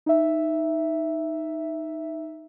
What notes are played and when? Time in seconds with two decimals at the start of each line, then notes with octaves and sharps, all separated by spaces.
0.06 D#4 E5